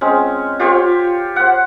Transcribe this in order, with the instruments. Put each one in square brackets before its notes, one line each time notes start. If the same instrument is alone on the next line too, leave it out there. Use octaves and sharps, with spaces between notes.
[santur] G#3 C4 C#4
F4 G4 C5 C#5
C5 F#5